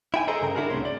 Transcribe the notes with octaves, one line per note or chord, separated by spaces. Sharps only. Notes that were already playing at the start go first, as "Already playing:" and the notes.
E4 G5 G#5
G#4 A4 C5 D#5 A#5
G2 C#3 A#4 A#5
D4 E4 F#4 G#4 A#4
C2 A2 C4 C#4 C#5 C6
D5